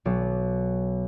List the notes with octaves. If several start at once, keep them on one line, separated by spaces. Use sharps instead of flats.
B1